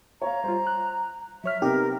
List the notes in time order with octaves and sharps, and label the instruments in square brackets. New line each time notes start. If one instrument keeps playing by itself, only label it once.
[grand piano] C#5 F5 [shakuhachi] A#5
[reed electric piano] G3 F4 [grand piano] C5
[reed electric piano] F#6
[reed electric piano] F#3 C#5 F6 [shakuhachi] E5
[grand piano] C3 B3 [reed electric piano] D#4 [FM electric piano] G4 [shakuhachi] A#4